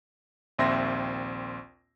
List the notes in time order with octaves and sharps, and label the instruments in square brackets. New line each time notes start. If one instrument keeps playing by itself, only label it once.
[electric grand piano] A#1 D#2 C4 E5 C6 A#6